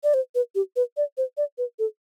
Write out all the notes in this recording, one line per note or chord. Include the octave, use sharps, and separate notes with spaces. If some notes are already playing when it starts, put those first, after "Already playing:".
D5
C5
B4
G4
B4
D5
C5
D5
B4
A4